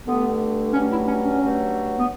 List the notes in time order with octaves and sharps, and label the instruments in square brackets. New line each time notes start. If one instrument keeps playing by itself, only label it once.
[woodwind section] G2 D3 A3 B3
G2 F#3 A3 C#4
E4
C#4
C#4
G2 F#3 A3
B3